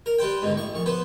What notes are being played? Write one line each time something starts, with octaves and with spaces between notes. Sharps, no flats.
A#4
G3 B4 C5 G5
G#2 B2 D3
A1 C#6
A#1 C#6
B3 B4 C5